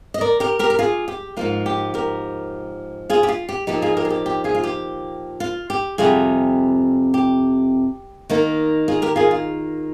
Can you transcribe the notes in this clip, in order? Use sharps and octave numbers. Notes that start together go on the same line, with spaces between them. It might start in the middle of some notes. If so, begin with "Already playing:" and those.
D#5
A#4 D5
G4 A#4
G4 A#4
A#4
F4 G#4
G4
G#2 F3 A#3 F4
G4
G4 A#4
F4 G#4
G4
F4
G4
A#2 F3 A#3 D#4 G4
F4 G#4
G4 A#4
G#4
G4
G4
F4 G#4
F4
G4
F4
G4
F2 C3 G3 F4 G#4
G4
D#3 A#3 D#4
F4 G#4
G4 A#4
F4 G#4
F4